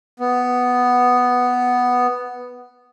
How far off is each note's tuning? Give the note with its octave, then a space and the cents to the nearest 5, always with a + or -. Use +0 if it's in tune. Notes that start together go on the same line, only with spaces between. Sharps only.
B3 +5